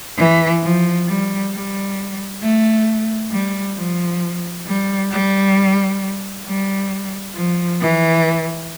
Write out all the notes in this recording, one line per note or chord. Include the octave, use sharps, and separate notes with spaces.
E3
F3
G3
G3
A3
G3
F3
G3
G3
G3
F3
E3